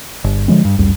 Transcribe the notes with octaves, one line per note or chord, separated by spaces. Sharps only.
G1
D3 F3 G#3 C4
G2
G1 C#2 F#2 G3